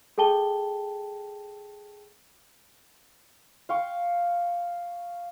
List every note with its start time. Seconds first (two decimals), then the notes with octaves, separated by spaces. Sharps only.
0.18 G#4 A4 G5 A5 G7
3.69 F5 G5 C#6